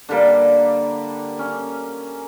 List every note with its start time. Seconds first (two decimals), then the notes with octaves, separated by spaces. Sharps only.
0.08 D3 G3 A#3 D4
1.39 C#4